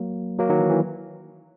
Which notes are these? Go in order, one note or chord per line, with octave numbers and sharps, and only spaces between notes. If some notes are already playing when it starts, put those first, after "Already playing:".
Already playing: F#3 A#3
F#3 A#3
D#3 F#3
E3
E3